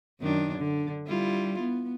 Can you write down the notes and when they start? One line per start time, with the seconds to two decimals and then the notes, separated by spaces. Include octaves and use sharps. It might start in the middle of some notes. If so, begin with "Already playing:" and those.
0.21 F#2 D#3 D4
0.58 D3
1.07 G3 E4 F4
1.59 B3